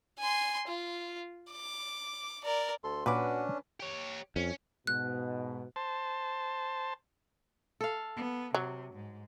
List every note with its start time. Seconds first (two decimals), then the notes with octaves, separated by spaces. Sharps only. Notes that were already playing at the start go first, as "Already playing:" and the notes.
0.19 G#5 C6
0.68 F4
1.51 D6
2.45 A#4 D5
2.84 D2 A4 C6
3.06 A#2 C#4 D4 F#4 B4 D6
3.80 G4 C#5
4.36 F2 C#4
4.87 G#2 B2 F#6
5.76 C5 A5
7.81 A4 F5
8.16 B3
8.54 C3 F#3
8.94 G#2